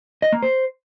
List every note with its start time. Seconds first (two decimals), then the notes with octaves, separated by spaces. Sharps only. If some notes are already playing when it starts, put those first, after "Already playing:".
0.22 D#5
0.32 A#3
0.43 C5